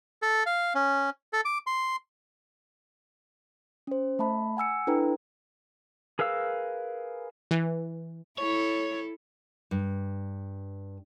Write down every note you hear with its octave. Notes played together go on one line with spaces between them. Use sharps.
A4
F5
C#4
A4
D6
C6
C#4 C5
A3 E5 A5 B5
F#5 G#5 E6 C#7
D4 E4 A4 B4 G5 A#5
G#4 A#4 B4 F5 E6
E3
E4 A4 C#5
G2